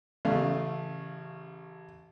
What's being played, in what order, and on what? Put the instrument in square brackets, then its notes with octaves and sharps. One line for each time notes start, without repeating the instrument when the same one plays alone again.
[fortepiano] A1 C#3 A3 F5